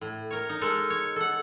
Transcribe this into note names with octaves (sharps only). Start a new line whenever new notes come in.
A2
A#4 C#5
D#4
G#3 A4 A#4
C#5
A4 F#5